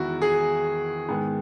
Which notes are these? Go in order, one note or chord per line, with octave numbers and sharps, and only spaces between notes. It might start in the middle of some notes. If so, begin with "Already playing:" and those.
Already playing: E2 D#3 G#3 B3 E4 F#4
G#4
G#2 D#3 G#3 B3